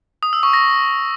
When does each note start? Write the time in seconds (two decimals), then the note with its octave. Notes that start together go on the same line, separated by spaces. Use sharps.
0.23 D#6
0.33 E6
0.43 C#6
0.53 A#6